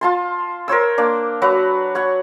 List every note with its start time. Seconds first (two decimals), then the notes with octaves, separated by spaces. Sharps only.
0.01 F4 A5 C6
0.68 A#4 C5 C#5 E6
0.98 A#3 D4
1.42 F#3 F#4 B4 A#5
1.95 C#5 F#5 C#6